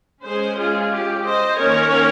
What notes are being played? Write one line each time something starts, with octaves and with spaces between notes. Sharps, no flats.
G#3 C#4 G#4 C5
F4 G#4
G4
C5 D#5
D#3 A#3 C#4 A#4 C#5